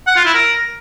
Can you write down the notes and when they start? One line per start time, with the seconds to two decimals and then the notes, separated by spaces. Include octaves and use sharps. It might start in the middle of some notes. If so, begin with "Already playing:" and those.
0.07 F#5
0.16 F4
0.25 E4
0.34 A#4